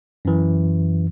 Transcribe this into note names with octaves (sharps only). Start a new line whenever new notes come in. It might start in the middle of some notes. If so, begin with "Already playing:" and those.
F#2 E3